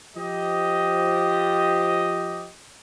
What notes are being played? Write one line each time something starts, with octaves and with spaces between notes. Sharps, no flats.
F3 G4 D#5